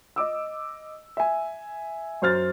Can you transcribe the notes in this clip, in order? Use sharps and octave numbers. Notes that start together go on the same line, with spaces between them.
D#5 D6 E6
E5 G#5
F#2 C5 F6 A6